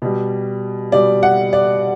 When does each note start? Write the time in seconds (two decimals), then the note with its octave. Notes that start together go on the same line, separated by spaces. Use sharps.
0.02 B2 G3
0.92 B2 G3 D5
1.23 F#5
1.53 D5